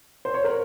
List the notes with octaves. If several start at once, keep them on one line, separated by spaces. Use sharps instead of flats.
C5
C#5
A#4